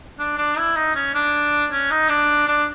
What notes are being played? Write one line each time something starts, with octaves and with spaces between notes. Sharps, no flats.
D4
D4
E4
D#4
C#4
D4
C#4
D#4
D4
D4